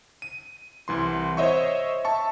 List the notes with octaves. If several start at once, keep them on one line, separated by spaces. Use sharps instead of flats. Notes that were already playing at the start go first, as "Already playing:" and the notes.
D#7
C2 E3 C6
C5 C#5 D#5 E5 C#6
E5 A5 C#6